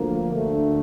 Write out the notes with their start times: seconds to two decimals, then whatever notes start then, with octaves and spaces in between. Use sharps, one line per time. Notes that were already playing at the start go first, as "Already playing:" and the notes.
Already playing: D2 D3 F3 A#3
0.32 D2 D3 A3